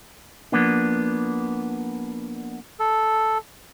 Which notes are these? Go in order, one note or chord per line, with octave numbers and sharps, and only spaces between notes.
F3 A#3 B3 D4
A4